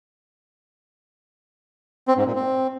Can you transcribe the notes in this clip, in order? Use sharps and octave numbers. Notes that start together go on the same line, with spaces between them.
C4
G#2
A#2
C4